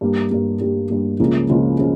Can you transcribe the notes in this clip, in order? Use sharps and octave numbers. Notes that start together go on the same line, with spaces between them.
G2 G3 A#3
G2 G3 A#3
G2 G3 A#3
G2 G3 A#3
C#2 C#3 F3 A#3 F4
C#2 C#3 F3 A#3 F4
C#3 F3